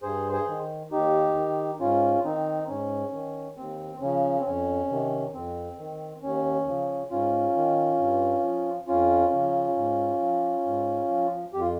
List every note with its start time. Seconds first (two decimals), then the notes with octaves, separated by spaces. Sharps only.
0.03 G2 G#4 C5
0.32 G#4 C5
0.47 D#3
0.91 D#2 D#4 G4
1.35 D#3
1.80 G#2 C#4 F4
2.24 D#3 C4 D#4
2.68 G#2 C#4
3.13 D#3
3.57 D#2 C4
4.01 C#3 F3 C#4
4.40 C4
4.45 F2 C#4
4.90 C3 D#3
5.34 F2 C4
5.78 D#3
6.22 D#2 C#4
6.67 C#3 F3
7.10 G#2 C#4 F4
7.56 D#3
7.99 G2
8.43 F3
8.87 F2 C#4 F4
9.32 C#3 F3
9.76 G#2
10.20 F3
10.65 G#2
11.09 F3
11.53 F2 G4
11.61 F4